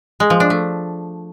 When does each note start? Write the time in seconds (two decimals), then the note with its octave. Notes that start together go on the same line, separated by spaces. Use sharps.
0.20 G#3
0.30 F3
0.40 D4
0.50 A3